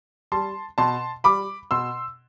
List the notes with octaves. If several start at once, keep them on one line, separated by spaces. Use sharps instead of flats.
G3 A5 C6
B2 A5 C6
G3 B5 D6
B2 C6 E6